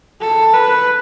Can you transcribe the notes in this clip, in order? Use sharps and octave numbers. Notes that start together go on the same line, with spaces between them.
A4
B4